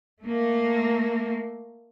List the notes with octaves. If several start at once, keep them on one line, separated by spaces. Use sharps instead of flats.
A3 A#3